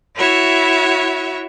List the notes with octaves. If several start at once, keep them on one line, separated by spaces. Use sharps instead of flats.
E4 F#4 C#5 E5